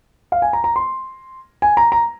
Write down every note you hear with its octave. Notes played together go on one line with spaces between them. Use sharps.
F5
G#5
A#5
A#5
C6
G#5
A#5
A#5